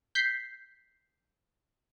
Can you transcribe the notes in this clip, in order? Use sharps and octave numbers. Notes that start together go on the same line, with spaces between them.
G6 B6 C7